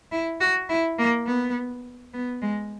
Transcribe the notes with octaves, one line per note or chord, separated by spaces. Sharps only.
E4
F#4
E4
A#3
B3
B3
G#3